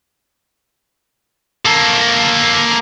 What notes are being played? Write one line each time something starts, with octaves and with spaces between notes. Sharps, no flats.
A#3 A4